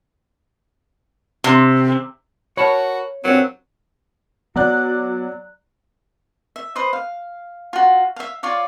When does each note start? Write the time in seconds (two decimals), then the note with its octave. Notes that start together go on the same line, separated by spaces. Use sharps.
1.44 C3
2.57 F#4 A#4 C#5 A5 B5
3.24 G2 A#2 F#3 C4 D4 C5
4.56 F#3 B3 F#4 D5 F#6
6.56 E5
6.75 B4 C5 D#5
6.93 F5
7.73 F4 F#4
8.16 E5 F5
8.43 F4 C#5 D5 F5